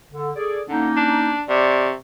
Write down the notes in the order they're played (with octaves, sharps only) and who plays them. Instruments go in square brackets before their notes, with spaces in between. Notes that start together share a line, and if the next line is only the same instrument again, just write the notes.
[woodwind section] D3
G#4 A4 D5
[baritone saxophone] D3 [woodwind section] A#3 C#4 D#4
[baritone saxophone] D4
[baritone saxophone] C3 [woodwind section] D5 C#6